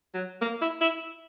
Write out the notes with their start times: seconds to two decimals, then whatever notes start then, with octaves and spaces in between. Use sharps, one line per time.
0.14 F#3
0.41 A#3
0.61 E4
0.81 E4